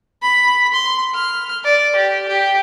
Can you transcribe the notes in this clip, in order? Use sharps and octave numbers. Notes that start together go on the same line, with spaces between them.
B5
C6
F6
D5
G4
G4